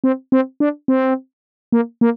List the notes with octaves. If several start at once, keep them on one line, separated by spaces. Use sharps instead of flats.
C4
C4
D4
C4
A#3
A#3